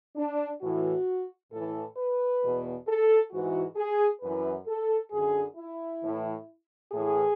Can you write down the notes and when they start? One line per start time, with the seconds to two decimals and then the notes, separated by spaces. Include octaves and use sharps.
0.16 D4
0.61 A2 E3 F#4
1.51 A2 E3 A4
1.97 B4
2.42 E2 B2
2.87 A4
3.32 G#2 E3 F#4
3.76 G#4
4.21 F#2 E3 B4
4.67 A4
5.11 F#2 D3 G#4
5.57 E4
6.02 A2 E3
6.92 A2 E3 G#4